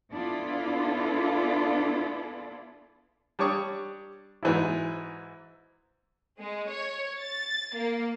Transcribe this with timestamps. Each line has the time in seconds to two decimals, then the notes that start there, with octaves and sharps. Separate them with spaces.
0.12 B3 D4 E4 F4 A4
3.39 G3 D4 C#5 C#6 D#6
4.43 G#2 E3 F#3 E4
6.39 G#3
6.70 C#5
7.20 A6
7.74 A#3